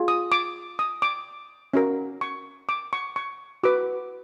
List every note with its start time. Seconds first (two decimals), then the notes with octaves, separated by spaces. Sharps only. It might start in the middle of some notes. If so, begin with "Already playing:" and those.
Already playing: F4 G#4
0.08 D#6
0.32 D6
0.79 D#6
1.02 D6
1.74 C#4 F#4 A#4
2.21 C#6
2.69 D6
2.93 C#6
3.16 C#6
3.63 F#4 B4 D6